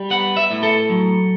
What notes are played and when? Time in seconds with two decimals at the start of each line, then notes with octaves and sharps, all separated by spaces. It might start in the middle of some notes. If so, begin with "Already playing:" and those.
Already playing: G3
0.10 B3 F#5
0.37 E5
0.51 A2
0.63 A4
0.90 F#3